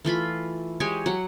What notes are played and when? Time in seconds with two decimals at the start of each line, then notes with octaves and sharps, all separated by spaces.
0.05 E3 A3 F4 B5
0.80 G#3 G4 C#5 G#5
1.06 F#3 F#5